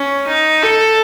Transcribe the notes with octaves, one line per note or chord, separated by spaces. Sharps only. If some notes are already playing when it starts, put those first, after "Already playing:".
Already playing: C#4
D#4
A4